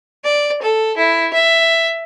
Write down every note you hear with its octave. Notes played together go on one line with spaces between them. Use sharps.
D5
A4
E4
E5